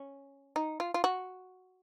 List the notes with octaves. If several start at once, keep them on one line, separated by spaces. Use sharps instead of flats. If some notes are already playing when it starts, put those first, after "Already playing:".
Already playing: C#4
D#4
F4
F4
F#4